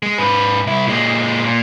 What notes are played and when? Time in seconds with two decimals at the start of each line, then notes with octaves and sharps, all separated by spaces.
0.03 G#3
0.18 G#2 B4
0.67 C2 E4
0.87 A#2 G#3
1.45 A#2